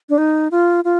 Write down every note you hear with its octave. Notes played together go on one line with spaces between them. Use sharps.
D4
D#4
F4
F4